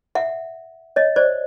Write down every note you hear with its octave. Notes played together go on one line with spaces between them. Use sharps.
E5 F#5
C#5 D#5
C5 D5